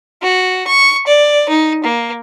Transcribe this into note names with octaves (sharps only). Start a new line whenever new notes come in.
F#4
C#6
D5
D#4
A#3